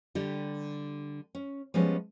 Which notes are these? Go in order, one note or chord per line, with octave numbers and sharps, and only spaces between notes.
D3 G3 G4
C#4
F3 G3 G#3 B3 C#4